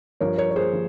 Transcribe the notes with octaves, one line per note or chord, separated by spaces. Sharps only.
G2 F3 A#4 C#5
A#4 C#5
C#5
G#4 C5
F3